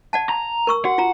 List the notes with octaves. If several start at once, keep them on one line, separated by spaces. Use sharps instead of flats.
D5 F#5 A5
A#5
A#4 C#6 E6
F#4 F#5
F4 A#5